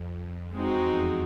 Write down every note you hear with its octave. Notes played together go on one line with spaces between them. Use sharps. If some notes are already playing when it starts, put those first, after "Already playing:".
Already playing: F2
E2 G#3 C4 D#4 F#4
F2